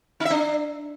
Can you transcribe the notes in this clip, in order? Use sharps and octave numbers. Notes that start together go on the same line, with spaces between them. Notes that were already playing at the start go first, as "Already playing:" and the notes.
D#4
E5
D4